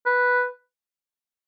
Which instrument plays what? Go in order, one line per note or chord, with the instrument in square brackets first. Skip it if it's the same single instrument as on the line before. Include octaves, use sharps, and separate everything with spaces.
[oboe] B4